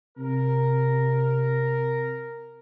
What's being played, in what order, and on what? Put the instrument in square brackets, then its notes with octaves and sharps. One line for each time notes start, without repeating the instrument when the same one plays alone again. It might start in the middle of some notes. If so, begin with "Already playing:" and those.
[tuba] C3 [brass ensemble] A#4